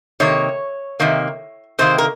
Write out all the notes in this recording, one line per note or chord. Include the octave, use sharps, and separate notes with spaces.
C3 D#3 A#3 C#5
C3 D#3 A#3
C3 D#3 A#3 C5
A#4